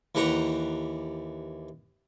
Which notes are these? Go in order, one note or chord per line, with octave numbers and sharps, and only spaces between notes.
D#2 E3 G4 F#5 A#5